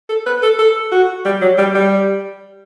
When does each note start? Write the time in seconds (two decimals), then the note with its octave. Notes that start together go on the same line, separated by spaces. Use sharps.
0.09 A4
0.26 B4
0.43 A4
0.59 A4
0.92 F#4
1.25 G3
1.41 F#3
1.58 G3
1.75 G3